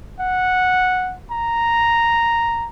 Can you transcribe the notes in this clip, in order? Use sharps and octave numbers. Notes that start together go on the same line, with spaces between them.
F#5
A#5